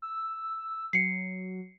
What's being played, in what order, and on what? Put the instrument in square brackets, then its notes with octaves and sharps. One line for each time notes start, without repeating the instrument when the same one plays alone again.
[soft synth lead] E6
[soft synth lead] F#3 [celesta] C7 C#7